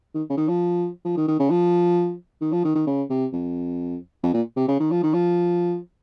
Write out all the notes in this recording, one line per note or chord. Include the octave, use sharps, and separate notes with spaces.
D#3
C#3
D#3
F3
F3
D#3
D#3
C#3
F3
D#3
F3
D#3
D#3
C#3
C3
F2
F2
A#2
C3
C#3
D#3
F3
D#3
F3